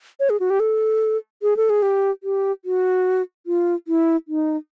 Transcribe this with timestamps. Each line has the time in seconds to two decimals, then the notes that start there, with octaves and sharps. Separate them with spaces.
0.20 C#5
0.30 G#4
0.40 F#4
0.50 G4
0.60 A4
1.43 G#4
1.57 A4
1.70 G#4
1.82 G4
2.23 G4
2.65 F#4
3.46 F4
3.88 E4
4.28 D#4